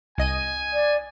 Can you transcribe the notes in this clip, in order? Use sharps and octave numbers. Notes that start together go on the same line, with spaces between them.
C2 D#5 G#5 D#7
D5